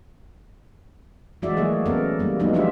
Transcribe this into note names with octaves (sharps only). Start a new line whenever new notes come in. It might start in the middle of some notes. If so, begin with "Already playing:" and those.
E3 G#3 F#4 D5 E5
F#3 A3 A#3 G#4
B3 C#4 A4 A#4
G3 A#3
F#3 G#3 A#3 B3 D#4
F3 G#3 D4 F4 G4 E5